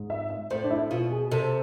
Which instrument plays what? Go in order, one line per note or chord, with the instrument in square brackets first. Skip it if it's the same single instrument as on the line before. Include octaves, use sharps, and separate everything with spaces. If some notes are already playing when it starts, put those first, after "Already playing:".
Already playing: [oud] G#2
[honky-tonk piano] E5
E5
[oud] A2 [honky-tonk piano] C5
[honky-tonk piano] D4
E4
[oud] B2 [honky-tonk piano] F4
[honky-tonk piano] G#4
[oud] C3 [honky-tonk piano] A4